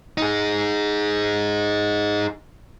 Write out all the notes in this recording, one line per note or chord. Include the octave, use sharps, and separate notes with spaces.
D#4 G#4